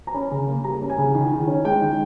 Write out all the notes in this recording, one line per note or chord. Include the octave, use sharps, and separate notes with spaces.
A#5
C#4 B5
C#3
A#3
G3 A#5
C#4
G#5
C#3
D#3
D#3
C#4
G#3 G5
D#3